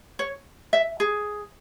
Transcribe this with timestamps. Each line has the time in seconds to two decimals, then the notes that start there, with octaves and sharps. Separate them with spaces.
0.19 C#5
0.73 E5
1.00 G#4